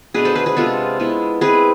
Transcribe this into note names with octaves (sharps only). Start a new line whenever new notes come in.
B2 A3 D4 G#4 B4
A4 C5
G#4 B4
G#4 B4
C3 G#3 B3 F4 A4
G#3 B3 E4
G#3 C4 E4 G#4 B4